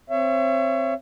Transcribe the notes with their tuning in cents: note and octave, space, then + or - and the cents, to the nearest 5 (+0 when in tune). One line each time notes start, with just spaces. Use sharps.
C4 +0 C#5 +0 E5 +40